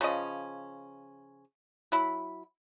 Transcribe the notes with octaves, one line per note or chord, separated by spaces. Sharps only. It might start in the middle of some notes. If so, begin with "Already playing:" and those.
C#3 F3 C#4 D#5
F#3 E4 B5